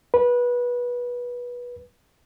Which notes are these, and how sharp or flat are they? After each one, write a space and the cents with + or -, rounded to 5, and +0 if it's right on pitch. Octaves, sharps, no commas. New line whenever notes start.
B4 -20